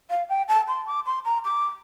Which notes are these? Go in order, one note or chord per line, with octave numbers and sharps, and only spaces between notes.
F5
G5
A5
C6
D6
C6
A#5
D6